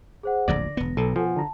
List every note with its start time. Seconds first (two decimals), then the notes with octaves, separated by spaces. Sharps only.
0.23 G#4 C5 F#5
0.48 D1 A#1 F2 D3 D5 A#6
0.77 E1 B3
0.97 B1 B2 A4
1.16 F3 F#5 G#5
1.36 D3 A5 A#5